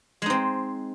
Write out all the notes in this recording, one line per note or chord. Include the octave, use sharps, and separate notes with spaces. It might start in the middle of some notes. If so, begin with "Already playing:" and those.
G#3 C4 D#4